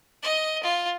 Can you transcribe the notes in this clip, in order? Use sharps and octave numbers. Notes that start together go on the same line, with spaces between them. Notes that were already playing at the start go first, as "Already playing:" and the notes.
D#5
F4